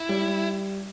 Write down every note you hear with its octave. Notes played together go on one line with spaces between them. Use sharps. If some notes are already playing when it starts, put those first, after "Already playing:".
Already playing: E4
G3